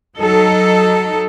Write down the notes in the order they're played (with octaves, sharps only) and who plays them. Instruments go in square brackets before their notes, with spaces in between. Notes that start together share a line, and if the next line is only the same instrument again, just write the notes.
[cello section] F#3 D#4 A4